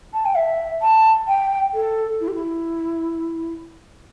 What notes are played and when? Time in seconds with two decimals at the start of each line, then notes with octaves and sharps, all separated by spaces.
0.14 A5
0.25 G5
0.36 E5
0.82 A5
1.28 G5
1.74 A4
2.20 E4
2.28 G4
2.34 E4